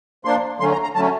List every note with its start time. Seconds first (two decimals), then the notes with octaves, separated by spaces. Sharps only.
0.25 F3 A#3 D4 C6
0.60 D3 F#3 A3 C#4 C6
0.72 A#5
0.83 A#5
0.95 D3 F#3 A3 C#4 A5